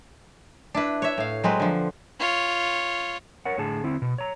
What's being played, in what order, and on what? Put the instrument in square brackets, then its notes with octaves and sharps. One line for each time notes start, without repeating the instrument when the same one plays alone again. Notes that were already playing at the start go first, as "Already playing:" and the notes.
[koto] D4 E4 B4
C#5 E5
A2 F5
F#3 G#3 C4 B4
D3 F3
[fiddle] F4 C#5
[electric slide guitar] A#4 C#5 F#5
A2 D3 G#4 A5
D3 C4 E4
B2
C#5 A#5